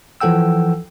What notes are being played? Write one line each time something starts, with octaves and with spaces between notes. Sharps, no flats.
E3 F3 A4 F#5 G5 E6